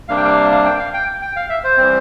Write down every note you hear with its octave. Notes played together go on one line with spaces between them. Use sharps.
C3 G3 A#3 D4 F5
G5
F5
F5
G5
F5
G5
G5
F5
E5
C5
E3 G3 C4